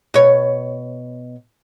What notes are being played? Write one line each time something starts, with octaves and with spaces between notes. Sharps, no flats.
B2 C#5